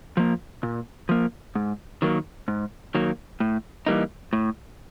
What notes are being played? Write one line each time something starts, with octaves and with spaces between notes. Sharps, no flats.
F3 A#3
A#2
F3 A#3
G#2
D#3 F#3 A#3
G#2
D#3 F#3 A#3
A2
E3 G3 A#3 D#4
A2